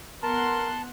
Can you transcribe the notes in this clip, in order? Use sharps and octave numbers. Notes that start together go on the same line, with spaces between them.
B3 A#4 F#5 A5 C6